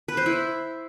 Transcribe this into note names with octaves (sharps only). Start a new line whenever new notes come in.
B4
C5
E4